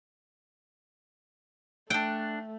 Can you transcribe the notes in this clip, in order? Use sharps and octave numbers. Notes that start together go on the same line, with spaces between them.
A3 D4 F#5 G5